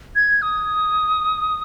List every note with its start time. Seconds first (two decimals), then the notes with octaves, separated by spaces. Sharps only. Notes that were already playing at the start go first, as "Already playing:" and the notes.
0.16 G#6
0.42 D#6